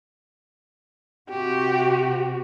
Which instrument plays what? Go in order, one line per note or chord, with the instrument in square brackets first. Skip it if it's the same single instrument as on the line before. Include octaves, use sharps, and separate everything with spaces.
[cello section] C3 F#4 [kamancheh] G4